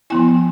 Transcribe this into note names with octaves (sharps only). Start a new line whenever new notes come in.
F3 B3 E4 G#5